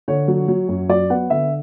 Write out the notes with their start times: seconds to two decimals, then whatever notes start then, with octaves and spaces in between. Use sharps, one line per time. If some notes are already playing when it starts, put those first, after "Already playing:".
0.08 D3 C#5
0.28 F#3
0.48 F#3
0.69 F#2
0.89 F#3 D5
1.10 B3 F#5
1.30 D3 E5